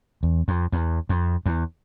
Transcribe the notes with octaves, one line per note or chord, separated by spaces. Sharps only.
E2
F2
E2
F2
E2